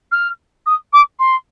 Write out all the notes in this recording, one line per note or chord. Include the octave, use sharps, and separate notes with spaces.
F6
D#6
D6
C6